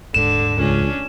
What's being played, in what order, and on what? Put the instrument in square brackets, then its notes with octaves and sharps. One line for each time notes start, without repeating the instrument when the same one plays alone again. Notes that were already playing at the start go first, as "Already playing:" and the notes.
[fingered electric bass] D#1 G#2 [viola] D3 [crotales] E7
[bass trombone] C#2 [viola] C#4 D4